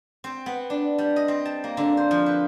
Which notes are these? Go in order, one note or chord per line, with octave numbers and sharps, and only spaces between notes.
C4
B3
D4
G3
D#5
C4
A5
A#3
D3
C5
F3
B4